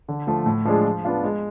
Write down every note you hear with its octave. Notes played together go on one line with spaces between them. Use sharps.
D3
F3 A3
A2
F3 G#3 D4 G#4
F3
B3 D4 F4
G#3